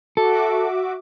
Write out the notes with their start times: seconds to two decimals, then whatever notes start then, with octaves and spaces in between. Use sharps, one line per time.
0.17 F#4 A4 E5 D6